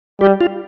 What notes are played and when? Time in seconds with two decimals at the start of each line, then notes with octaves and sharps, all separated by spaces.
0.21 G3 G4
0.41 F4